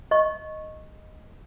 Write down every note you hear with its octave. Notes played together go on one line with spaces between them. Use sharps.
D#5 C#6